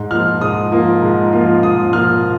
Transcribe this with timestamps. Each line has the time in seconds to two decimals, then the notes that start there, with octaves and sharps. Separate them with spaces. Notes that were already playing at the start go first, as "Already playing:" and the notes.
Already playing: G#2
0.11 F3 A#3 F4 F6
0.41 G#2 D#6
0.72 F3 A#3 F4
1.02 G#2
1.33 F3 A#3 F4
1.63 G#2 D#6
1.93 F3 A#3 F4 F6